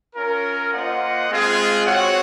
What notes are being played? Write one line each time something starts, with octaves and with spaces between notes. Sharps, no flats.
C#4 F4 A#4
A#3 F4 C5 D#5 F#5
G#3 C4 F4 G#4
C4 F#4 C#5 F#5